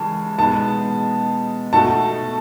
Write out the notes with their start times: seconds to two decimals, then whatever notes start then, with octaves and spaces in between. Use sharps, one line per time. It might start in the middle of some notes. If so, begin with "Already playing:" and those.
Already playing: C#3 E3 G#3 A5
0.39 B2 G#3 B3 D#4 G#4 A5
1.73 B2 A3 D#4 F#4 A4 A5